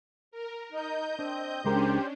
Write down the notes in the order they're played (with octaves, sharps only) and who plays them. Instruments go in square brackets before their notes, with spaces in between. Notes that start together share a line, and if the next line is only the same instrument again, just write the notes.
[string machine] A#4
[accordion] D#4 [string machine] D#5 G6
[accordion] C4 [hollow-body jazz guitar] D4
[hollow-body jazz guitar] C#2 G#3 A#4 [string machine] C#4 D4 [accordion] G4 C5